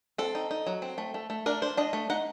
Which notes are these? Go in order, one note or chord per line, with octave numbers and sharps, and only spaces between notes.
C4 A4
D#4
D#4
F#3
C4
A3
A3
A3
D4 A#4
D4 C5
D4 D#5
A3
D#4 F#5